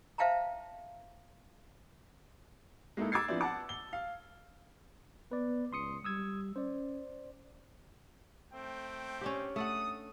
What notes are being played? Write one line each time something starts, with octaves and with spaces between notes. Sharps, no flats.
C5 E5 F5 G5 A5 A#5
G#3 A#3 D#4 E4 A4
D6 E6 G#6 A6 C7
F3 B3 C4 D4 E4 D5
F#5 A5 D6
G7
F5
B3 B4 D5
C#2 C6 D#6 C#7
G3 D#6 E6 G#6
C#4 C5 D5
A3 C4 G5
C#4 D4 G4
A3 A4 F#5 D#6